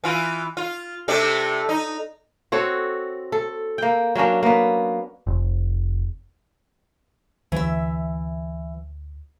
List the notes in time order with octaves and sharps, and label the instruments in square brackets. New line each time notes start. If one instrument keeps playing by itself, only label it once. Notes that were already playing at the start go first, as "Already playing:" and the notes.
[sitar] E3 F4
F4
C3 A3 D4
D#4
[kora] C4 F#4 A4 C#5
A4
A#3 G5
F#3 A#3 C#4 D4
A#3 B3
[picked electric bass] F1
[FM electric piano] D2 [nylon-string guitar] E3 E5